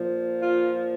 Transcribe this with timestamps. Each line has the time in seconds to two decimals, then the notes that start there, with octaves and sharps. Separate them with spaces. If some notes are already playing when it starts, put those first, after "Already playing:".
Already playing: A#2 F3
0.40 F4